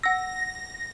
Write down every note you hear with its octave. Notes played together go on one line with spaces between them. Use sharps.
F#5 E6 A#6